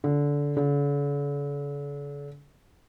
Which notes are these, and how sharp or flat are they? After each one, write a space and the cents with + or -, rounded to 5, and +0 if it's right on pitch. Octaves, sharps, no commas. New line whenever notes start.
D3 -20
D3 -45